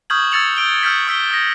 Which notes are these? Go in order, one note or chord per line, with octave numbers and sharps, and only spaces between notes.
C#6 D#6 F6 G6 G#6 F#7
E6 G#6 A6 C#7 F7 F#7
E6 G6 D7 G7
E6 F6 G6 B6
C#6 E6 B6 G7
D#6 A#6